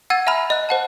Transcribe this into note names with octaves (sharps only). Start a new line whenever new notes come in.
F#5 E6 G#6 A6 D#7
E5 G#5 A#5 B5 F6
D#5 F#6
C5 F#5 A5